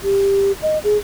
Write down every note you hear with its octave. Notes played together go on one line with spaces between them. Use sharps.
G4
D#5
G#4